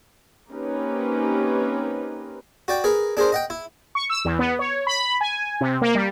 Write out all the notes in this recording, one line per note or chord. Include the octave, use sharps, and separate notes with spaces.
A#3 C4 C#4 D#4 G4 B4
F#4 D5 G5
G#4 A#4 B4 A#5
D4 G#4 A#4 C5
D#5 F#5 G5
E4
C#6
E6
E2
B3
C#5
B5
G#5
C3
A#3
G3